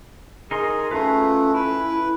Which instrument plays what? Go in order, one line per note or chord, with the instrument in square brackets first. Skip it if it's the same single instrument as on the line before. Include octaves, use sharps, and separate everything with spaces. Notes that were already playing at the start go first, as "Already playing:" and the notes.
[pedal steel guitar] D#4 A#4 C6 [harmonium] G#4
[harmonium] A3 [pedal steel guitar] C#4 F4 B4
[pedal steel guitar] E4 [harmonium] B4